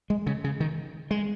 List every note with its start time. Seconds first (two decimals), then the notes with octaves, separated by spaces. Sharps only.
0.10 G#3
0.26 C#3
0.44 C#3
0.60 D#3
1.11 G#3